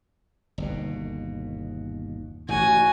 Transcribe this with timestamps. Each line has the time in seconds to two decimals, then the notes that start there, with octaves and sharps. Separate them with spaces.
0.58 G1 D#2 B2
2.49 A1 G#2 F#4 G#5